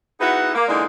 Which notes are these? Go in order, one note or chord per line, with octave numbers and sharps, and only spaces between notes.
B3 D#4 E4 F#4 G#4 B4
A#3
D3 E3 G#3 A#3 D4 D#4